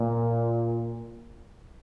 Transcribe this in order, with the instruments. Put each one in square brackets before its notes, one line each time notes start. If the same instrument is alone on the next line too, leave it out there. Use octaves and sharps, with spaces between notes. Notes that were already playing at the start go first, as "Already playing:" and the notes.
Already playing: [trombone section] A#2